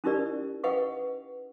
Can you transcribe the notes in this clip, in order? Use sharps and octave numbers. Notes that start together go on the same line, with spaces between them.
C#4 D#4 E4 G4 A#4 D5
B4 D#5 F#5 G5 C#6